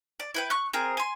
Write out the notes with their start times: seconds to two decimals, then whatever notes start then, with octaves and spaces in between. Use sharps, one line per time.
0.20 D5
0.34 E4 B4 G5
0.50 C#6 F#6
0.73 C4 G#4 A#4
0.97 G#5 C6